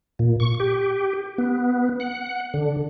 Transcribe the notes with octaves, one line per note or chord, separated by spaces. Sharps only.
A#2
C#6
G4
B3
F#5
D3